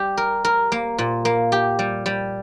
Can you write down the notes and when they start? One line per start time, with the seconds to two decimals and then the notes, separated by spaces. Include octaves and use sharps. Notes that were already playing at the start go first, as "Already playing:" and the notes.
Already playing: G3 G4
0.17 A#4
0.44 A#4
0.72 A#3
0.98 A#2
1.25 A#3
1.52 G4
1.79 G3
2.06 G3